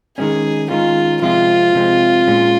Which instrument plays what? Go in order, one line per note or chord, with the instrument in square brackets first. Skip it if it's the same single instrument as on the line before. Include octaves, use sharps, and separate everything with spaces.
[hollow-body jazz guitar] D#3 G#3 C#4 [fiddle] G#4
[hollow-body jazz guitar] D#3 G#3 C#4 [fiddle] F4
[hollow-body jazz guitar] C3 F3 G#3 C4 [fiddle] F4
[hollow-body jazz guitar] C3 F3 G#3 C4
A#2 G#3 C#4